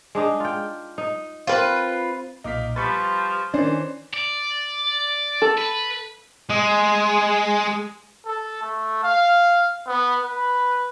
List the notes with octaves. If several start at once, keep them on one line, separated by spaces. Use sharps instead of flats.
G#3 D4 D#4
F4 G5
D#4
C4 F4 A#4 B4
B1 A#2 D#4 F5 D6 B6
F3 G3 B4 B5 C#6 A6
D#3 E3 C#4 D4 C5 D5 C7
D5
A4
B4
G#3
A4
A3
F5
B3
B4